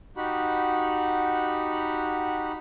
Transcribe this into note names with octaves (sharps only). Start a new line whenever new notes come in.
D#4 F#4 G4 F#5 B5